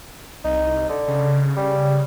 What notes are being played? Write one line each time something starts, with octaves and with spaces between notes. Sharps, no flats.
C2 D#4
D3
C#3
G3